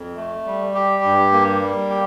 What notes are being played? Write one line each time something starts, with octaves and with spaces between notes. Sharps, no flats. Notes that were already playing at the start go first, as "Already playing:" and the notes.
Already playing: F2
A3
G3
G4
G2
A#3
G3
G4